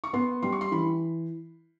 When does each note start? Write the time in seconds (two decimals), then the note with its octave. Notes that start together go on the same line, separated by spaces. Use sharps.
0.04 C#6
0.13 B3 C6
0.42 G3 C6
0.52 C#6
0.61 C6
0.72 E3 B5